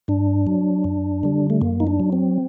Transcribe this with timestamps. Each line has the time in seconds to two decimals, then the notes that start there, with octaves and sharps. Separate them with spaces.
0.08 G2 D4
0.47 F#3
0.84 F#2
1.23 D3 G3
1.50 A3
1.61 F#2 A#3
1.80 D#4
1.87 D4
2.00 F#3
2.13 C4